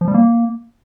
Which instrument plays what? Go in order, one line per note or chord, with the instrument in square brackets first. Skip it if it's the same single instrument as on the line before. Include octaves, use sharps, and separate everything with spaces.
[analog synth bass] F3
G3
A#3